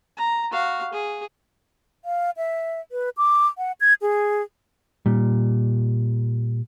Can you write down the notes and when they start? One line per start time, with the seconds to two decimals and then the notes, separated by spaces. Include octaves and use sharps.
0.17 A#5
0.51 F#4 F5
0.93 G#4
2.05 F5
2.37 E5
2.92 B4
3.17 D6
3.58 F#5
3.80 G#6
4.02 G#4
5.06 A#2 G3